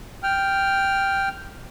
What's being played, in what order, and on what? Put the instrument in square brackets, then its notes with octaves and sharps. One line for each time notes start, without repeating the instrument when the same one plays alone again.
[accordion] G5 F6